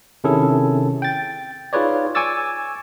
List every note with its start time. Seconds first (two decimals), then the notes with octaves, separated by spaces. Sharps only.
0.24 C3 D#3 C#4 E4 G#4 A4
1.02 G5 A6
1.73 D#4 F4 G#4 B4 C#5 D5
2.15 G#5 C#6 D6 E6 A6